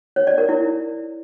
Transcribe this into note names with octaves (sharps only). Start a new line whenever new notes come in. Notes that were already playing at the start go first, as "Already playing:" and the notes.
C#5
D5
A#4
E4